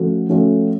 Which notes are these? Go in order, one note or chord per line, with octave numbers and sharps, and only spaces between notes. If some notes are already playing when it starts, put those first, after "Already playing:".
Already playing: F3 A3 C#4 F#4 A4
F3 A3 C#4 F#4 A4